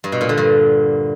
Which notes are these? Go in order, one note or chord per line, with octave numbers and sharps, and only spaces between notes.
G2
B2
A#2
D3
G2